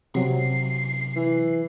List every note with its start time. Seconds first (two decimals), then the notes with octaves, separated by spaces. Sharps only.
0.15 C3 F#3 C7
1.16 E3